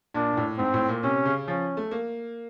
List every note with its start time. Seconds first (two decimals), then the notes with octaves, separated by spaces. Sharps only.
0.15 A#2 D4
0.32 A#2
0.37 A2
0.58 G#2 C4
0.74 A2
0.89 A#2
1.03 C3 C#4
1.25 C#3
1.48 F3 C#4
1.77 A3
1.91 A#3